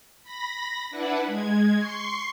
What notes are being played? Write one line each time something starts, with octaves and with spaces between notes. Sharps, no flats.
B5 A#6
D4 E4 B4 F#5
G#3 G#6
C6 C#6 C7